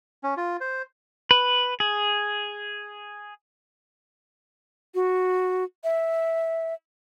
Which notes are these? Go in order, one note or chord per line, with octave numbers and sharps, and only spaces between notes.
C#4
F4
C5
B4
G#4
F#4
E5